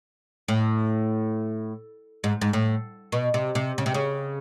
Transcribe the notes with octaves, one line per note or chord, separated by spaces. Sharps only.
A2
G#2
G#2
A2
B2
C3
C3
C#3
C3
C#3